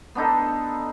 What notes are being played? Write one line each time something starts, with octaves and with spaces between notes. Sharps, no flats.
B3 D4 D#4 A4